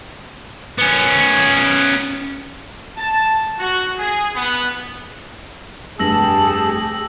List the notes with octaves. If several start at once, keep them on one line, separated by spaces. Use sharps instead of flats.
B3 C#4
A5
F#4
G#4
B3
F1 G2 G4 G#4 A5 E6 A#6 F#7